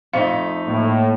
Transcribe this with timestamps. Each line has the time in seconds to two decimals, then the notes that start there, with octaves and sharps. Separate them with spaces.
0.13 F2 A3 D#4 F5
0.68 A2 A#3